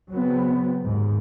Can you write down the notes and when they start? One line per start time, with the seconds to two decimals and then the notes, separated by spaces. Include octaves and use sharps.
0.12 C#3 F#3 B3 C4
0.83 D#2 G#2